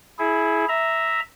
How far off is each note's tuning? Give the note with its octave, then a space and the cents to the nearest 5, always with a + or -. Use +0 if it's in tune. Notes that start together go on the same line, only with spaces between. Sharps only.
E4 -5 G#4 +25
E5 -5 A#5 +0